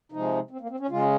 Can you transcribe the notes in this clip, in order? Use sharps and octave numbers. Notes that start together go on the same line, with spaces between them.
C3 F3 G#3 D#4
C4
A#3
C4
C#4
C#3 G#3 F4